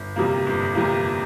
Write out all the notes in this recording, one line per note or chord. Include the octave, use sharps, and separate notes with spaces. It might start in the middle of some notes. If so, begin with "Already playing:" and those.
Already playing: G1
F2 C3 G3 A#3
G1
F2 C3 G3 A#3